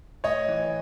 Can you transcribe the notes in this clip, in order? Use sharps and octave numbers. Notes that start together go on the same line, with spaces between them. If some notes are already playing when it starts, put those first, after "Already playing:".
A2 C#5 D#5
E3